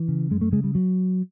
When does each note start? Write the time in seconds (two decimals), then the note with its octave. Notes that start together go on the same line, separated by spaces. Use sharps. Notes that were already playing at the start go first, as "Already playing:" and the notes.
Already playing: E3
0.08 C#3
0.31 F#2 G#3
0.41 A3
0.52 C#3 G#3
0.64 G3
0.75 F#3